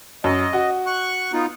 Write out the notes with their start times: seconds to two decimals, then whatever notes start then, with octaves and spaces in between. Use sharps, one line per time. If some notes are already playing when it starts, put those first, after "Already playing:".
0.24 F#2 D#5
0.53 F#4
0.86 C#6 F#6
1.33 B3 D#4 F4